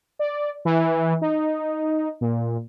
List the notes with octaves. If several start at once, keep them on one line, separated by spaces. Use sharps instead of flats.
D5
E3
D#4
A#2